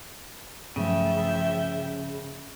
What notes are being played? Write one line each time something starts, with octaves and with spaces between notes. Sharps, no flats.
G2 C#3 F3 F#3 A3 E5 G5